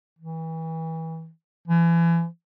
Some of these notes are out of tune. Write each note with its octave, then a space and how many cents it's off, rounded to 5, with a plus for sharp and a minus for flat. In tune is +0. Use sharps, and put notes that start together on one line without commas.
E3 -30
E3 +35